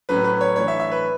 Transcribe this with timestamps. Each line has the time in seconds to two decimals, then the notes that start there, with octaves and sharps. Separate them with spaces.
0.09 A2 F#3 A3 C#4 B4
0.24 B4
0.41 C#5
0.56 E3 A3 D4 C#5
0.68 E5
0.80 E5
0.91 B4